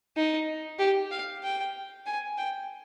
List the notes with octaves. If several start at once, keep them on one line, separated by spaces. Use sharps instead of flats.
D#4
G4
F5
G5
G#5
G5